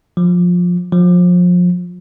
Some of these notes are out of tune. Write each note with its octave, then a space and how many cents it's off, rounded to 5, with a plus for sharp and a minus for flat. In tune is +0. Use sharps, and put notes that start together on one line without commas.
F3 +20
F3 +30